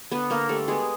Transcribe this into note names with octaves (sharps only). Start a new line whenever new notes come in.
D3 B3 B4
D3 A#3 A#4
G3 A3 A4
G#3 B3 G#4